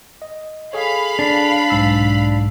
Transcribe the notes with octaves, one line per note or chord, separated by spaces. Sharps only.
D#5
G#4 A4 C#5 F5 B5
D4
B1 G#2 E6